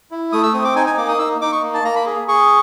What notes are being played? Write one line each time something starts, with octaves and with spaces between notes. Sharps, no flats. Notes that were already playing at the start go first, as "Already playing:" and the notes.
E4
A3 D#6
E6
C4 D#6
D6
D#4 G#5
G#5
A#3 D6
D#6
D#4 E6
D#4 D6
C#6
A#3
A5
A#3 A#5
B5
G#4
G#4 C#6